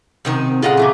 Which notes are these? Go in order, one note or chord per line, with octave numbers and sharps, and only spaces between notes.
F#2 C3 D#3 D#4
A#2 C#3 F4 G#4 A4 D#5 F#5
E3 A3 A#3